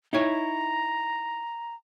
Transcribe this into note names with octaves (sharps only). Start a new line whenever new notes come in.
D#4 E4 C#5 A#5